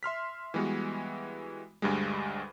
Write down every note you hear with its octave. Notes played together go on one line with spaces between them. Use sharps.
E5 C6 F6 B6
E3 G3 G#3 B3 F#4
D2 G2 G3 G#3